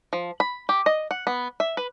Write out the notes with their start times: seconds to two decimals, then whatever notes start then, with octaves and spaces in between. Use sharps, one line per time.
0.13 F3
0.40 B5
0.69 G4
0.86 D#5
1.11 F#5
1.27 B3
1.60 E5
1.77 B4